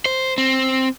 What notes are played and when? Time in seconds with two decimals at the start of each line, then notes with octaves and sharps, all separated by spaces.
0.06 C5
0.38 C4